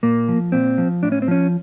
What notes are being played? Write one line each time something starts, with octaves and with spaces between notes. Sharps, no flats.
A#2 A#3
F3
A#2 C4
F3
A2 D4
C#4
C4
F3 C#4